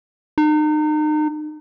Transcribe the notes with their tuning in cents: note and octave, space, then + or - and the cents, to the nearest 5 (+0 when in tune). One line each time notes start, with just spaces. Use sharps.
D#4 -35